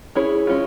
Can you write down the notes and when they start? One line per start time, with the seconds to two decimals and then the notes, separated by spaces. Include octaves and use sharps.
0.15 C#4 E4 G#4 C#5
0.47 G#3 C#4 F4